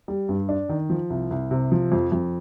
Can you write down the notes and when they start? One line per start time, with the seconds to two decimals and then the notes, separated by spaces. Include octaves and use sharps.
0.08 G3
0.29 G2
0.49 D4
0.69 D#3
0.90 F3
1.10 C2
1.31 C2
1.51 C3
1.72 F3
1.92 F2
2.12 F2